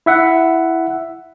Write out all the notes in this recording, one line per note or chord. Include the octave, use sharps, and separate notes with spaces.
E4 E5 F#5